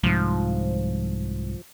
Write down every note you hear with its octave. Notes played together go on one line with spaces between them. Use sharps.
C2 G#2 F3